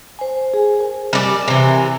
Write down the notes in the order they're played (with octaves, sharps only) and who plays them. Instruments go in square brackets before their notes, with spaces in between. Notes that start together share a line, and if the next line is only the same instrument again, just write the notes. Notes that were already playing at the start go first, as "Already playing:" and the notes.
[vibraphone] C5 G#5
G#4
A#4 C5 G#5
[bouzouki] G3 D5
C3 E3